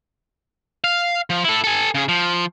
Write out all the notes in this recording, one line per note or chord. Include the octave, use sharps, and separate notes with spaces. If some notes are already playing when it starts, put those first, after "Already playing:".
F5
F3
E4 A4
A4 G#5
C#3 G#4
F3